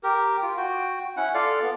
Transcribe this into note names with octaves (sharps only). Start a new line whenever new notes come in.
G4 A#4
F4
F#4 G5
C#4 E4 F#5
F4 A4 D5 F5
B3